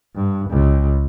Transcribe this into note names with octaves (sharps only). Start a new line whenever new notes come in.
G2
C#2